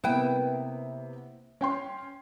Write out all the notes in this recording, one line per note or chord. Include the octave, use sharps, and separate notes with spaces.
C3 A#3 B3 E4 B4 G5
C#4 G5 C6